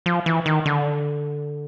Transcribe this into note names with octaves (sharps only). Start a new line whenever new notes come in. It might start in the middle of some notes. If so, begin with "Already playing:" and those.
F3
E3
D#3
D3